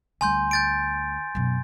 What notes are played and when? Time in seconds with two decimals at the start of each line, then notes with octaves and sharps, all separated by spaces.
0.21 D2 G3 G#5 C6 G6
0.51 G6 A6 D7
1.35 F#2 B2